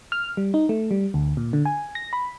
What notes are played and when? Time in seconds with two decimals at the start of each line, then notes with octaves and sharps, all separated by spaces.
0.12 F6
0.37 G3
0.54 D#4
0.69 A3
0.91 G3
1.14 D2
1.37 A#2
1.53 D3
1.65 G#5
1.95 A#6
2.13 B5